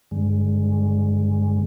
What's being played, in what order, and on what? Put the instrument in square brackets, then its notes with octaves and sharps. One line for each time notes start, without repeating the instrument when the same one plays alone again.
[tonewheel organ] G2 D3 G#3